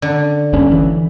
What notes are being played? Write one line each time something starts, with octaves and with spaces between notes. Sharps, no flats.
D3
G1 G2 C#4
E3